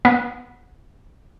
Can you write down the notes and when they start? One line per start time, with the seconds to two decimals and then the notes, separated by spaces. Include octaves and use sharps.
0.05 B3